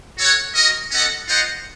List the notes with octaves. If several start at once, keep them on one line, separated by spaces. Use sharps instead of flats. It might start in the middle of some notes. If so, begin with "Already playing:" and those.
F#4 A4 C#5 F#5
F#4 A#4 D#5
C#4 A4 D#5 F#5
F4 C5 D#5 F#5